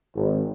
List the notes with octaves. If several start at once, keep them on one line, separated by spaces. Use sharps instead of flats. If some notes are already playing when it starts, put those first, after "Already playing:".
G#1